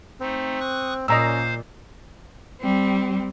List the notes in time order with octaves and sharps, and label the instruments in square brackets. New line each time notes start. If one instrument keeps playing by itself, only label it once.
[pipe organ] A3 D#4 [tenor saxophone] C4
[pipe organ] C#6 D#6 F#6
[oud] A#2 [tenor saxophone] C#4 [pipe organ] C5 F5 [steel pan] D#5 A#5 E6
[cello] G3 C4